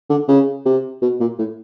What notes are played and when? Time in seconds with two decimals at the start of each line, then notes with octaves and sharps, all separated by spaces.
0.10 D3
0.28 C#3
0.65 C3
1.02 B2
1.20 A#2
1.39 A2